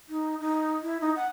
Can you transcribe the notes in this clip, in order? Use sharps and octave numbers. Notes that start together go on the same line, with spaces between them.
D#4
D#4
E4
D#4
F#5